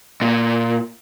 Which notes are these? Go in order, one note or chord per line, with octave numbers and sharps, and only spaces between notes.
A#2